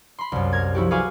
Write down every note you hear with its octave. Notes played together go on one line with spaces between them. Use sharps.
B5 C6
C2 F#2
A#4 G#6
F3 E4 F#4 G4
F#4 G#4 B4 F5 G#5 D6